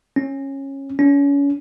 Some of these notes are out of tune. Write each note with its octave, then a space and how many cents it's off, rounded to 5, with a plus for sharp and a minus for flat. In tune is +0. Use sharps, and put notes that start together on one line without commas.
C#4 -20
C#4 +30